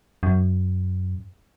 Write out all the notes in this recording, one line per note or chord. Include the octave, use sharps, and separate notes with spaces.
F#2